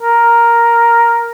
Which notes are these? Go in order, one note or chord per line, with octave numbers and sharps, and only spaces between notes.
A#4